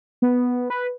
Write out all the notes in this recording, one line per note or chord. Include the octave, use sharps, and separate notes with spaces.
B3
B4